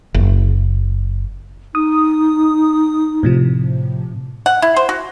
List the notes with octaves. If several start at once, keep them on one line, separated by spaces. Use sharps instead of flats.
F#1
D#4 D#6
A2 C3 F3
F#5
E4
C5
F#4